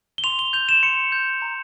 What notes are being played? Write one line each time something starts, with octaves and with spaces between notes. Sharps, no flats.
G7
C6 F7
G7
G6 F7
E7
C6 C#7
G6
A#5